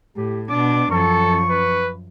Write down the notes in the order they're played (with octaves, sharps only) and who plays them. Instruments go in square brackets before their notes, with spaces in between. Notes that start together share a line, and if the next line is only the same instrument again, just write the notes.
[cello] A2 [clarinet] G4
[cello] B2 D4 [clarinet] D6
[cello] F#2 F3 [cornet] A4 [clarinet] C#6
[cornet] B4